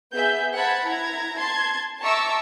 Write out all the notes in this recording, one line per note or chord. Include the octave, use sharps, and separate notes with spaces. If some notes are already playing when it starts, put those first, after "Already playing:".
B3 G#4 E5 G6
C5 F#5 A5 B5 G#6
E4 A#5 G#6
A5 C6 G#6
E5 A5 A#5 C#6 D6 E6